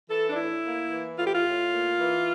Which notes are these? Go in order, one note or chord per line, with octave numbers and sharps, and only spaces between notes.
E3 A4
D4
A2 E4
A#3
E3
A2 F4
G4
F4
A2
A#3
E3